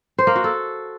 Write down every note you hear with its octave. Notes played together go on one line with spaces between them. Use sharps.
C5
A#3
F#4
A4